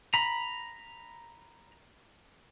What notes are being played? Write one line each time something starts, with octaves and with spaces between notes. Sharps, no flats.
A#5 B5